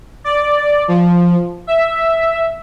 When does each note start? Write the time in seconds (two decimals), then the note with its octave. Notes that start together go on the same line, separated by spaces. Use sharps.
0.24 D5
0.88 F3
1.67 E5